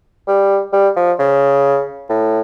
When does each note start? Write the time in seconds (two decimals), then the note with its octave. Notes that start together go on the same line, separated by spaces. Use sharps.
0.28 G3
0.73 G3
0.96 F3
1.19 C#3
2.10 A2